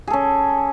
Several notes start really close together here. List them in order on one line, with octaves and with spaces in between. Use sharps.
G#4 A4 C#4